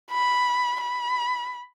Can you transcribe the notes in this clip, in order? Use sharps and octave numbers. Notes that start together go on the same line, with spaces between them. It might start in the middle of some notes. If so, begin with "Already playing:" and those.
B5
B5